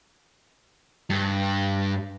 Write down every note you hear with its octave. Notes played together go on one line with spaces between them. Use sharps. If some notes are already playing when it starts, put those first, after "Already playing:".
G2